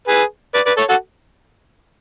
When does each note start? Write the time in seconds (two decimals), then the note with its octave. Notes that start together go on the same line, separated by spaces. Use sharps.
0.08 G#4 B4
0.55 B4 D5
0.66 B4 D5
0.78 A4 C#5
0.89 F#4 A4